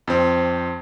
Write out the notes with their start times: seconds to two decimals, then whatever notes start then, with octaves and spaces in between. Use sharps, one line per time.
0.07 F2 C4